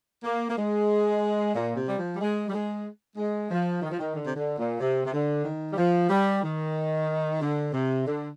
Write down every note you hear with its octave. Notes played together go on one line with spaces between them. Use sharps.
A#3
A#3
G#3
A#2
C3
G3
F3
G3
G#3
G3
G#3
G#3
F3
D#3
F3
D#3
D3
C3
D3
A#2
C3
C3
D3
D#3
G3
F3
G3
D#3
D3
C3
D3